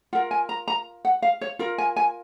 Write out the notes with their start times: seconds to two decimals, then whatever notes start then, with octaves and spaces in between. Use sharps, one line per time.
0.13 F4 A#4 F#5
0.31 G#5
0.49 A#5
0.68 A#5
1.05 F#5
1.22 F5
1.41 C#5
1.59 F4 A#4
1.78 G#5
1.96 G#5